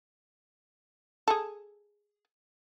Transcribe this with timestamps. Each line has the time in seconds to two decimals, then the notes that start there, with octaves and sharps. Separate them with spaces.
1.28 G#4 A4